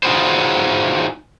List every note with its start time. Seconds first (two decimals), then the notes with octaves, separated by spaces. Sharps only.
0.03 D#4 F4 F#4 G#4 B4 C5